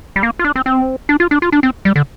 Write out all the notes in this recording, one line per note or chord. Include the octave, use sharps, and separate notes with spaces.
G3
A#3
F4
D4
C4
C4
D4
F4
D4
F4
D4
C4
G3
D3